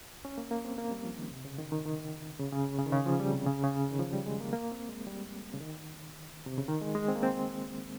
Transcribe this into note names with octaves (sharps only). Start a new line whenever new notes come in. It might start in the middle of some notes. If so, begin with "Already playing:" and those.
C#4
A#3
A#3
C4
A#3
G3
F3
D#3
C3
C#3
D#3
D#3
D#3
C#3
C#3
C#3
D#3
C#3
F3
G3
C3
C#3
C#3
D#3
F3
G3
G#3
A#3
A#3
C4
G#3
G3
C#3
D#3
C3
C#3
D#3
G#3
G#3
C4
A#3
C4